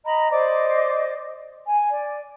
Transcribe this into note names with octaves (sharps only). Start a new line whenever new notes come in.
D#5 A#5 B5
C5 D5 D#5 D6
G#5
D5